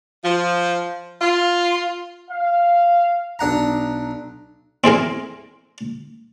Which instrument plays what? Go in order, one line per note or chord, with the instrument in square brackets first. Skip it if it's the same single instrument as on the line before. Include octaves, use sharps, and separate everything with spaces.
[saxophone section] F3
F4
[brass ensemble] F5
[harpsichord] B1 D4 F#5 A#5
C4 E4 G#4 A#4